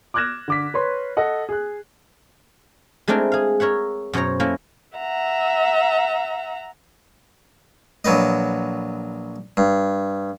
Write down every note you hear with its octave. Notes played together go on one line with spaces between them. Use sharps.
D6 F6 F#6 G#6 A#6 E7
D3 D6 B6
B4 C#5 C6
A4 D#5 F#5
G#4 F#6
G#3 A3 C4 D4 E4 A#4
G#4 F5
A#4 C#5 E5 F#5
F#2 B2 C5 C#5 A#5
A3 A#3 C#4 E4 A#4
E5 F#5 A#5
A#1 F#3 B3 B4 D#5
G2